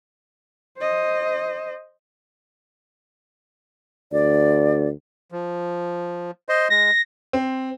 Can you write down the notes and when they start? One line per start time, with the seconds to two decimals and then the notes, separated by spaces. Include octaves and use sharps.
0.78 C5 D#5
4.12 D2 D5
5.32 F3
6.49 C5 D#5 C6
6.70 G#3 A#6
7.33 C4